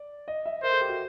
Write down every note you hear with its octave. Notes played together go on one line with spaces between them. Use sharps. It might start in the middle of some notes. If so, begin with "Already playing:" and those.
Already playing: D5
D#5
E5
A#4 C5
A4
G4
F#4